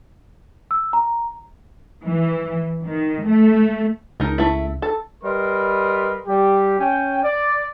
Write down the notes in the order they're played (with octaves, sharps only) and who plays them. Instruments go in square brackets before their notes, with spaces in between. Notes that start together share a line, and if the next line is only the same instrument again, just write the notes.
[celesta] E6
A#5
[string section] E3
D#3
A3
[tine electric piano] C#2 [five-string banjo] D#4 A#4
[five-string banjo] A3 E4
A4
[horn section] G3 A#4 B4 D#5 C6
G3 G4
C#4 G5
D5